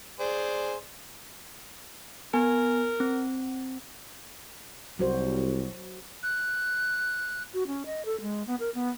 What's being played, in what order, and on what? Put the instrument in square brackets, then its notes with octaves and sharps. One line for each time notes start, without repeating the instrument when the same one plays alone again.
[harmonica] G#4 C5 D5
[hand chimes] B3 G#5 [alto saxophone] A#4
[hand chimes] C4
[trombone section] C2 [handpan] F#3 F#4 C5
[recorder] F#6
[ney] F#4
C#4
D#5
A4
G#3
B3
A#4
B3